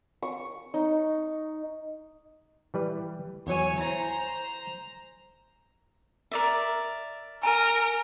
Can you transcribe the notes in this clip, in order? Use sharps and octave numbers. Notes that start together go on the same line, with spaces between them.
C#6
D#4
E3 G3 B4
E2 E3 F#3 C#5 G#5
E4 C5 A#5
A#4 D5 E5
A#4 G#5 A#5 D#7